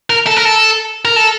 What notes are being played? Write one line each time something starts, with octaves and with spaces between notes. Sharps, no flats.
A#4
A4
A#4
A4
A#4
A4